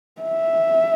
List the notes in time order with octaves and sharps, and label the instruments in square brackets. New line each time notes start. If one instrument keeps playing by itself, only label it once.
[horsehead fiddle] E5